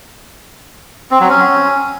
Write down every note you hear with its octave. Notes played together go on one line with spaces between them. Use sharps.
C4
F#3
C#4